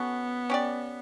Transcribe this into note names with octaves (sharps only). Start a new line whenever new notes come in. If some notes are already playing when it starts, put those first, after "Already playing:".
Already playing: B3 C#4 F#4 A4
C#4 G4 D5